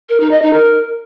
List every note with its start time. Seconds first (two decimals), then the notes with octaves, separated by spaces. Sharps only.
0.09 A#4
0.20 D#4
0.31 D#5
0.42 D#4
0.53 A#4